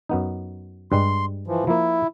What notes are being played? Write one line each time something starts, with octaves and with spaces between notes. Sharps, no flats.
F#2 B3 D#4
G2 G3 G#3 C6
E3 F3
F3 A#3 E4